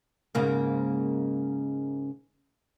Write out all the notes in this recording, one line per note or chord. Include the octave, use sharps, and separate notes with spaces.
G#2 C#3 A#3